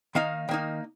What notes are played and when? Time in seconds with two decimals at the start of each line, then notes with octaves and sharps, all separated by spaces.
0.15 D#3 A#3 D#4 F5
0.49 D#3 A#3 D#4